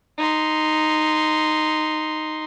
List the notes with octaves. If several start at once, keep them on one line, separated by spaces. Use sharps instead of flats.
D#4 C6